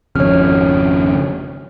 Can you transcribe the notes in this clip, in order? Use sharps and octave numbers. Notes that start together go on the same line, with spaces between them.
G#1 F2 C#3 C#5 F6